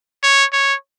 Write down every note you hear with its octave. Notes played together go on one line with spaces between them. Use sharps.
C#5
C#5